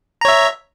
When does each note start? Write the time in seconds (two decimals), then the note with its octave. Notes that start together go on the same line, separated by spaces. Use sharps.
0.21 A#5
0.25 C#5
0.28 E5